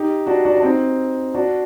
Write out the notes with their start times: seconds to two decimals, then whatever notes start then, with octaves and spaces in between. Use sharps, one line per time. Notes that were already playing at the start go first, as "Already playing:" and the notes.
Already playing: D#4 G4
0.26 D4 F#4
0.45 D4 F#4
0.57 D4
0.63 C4 D#4
1.34 D4 F#4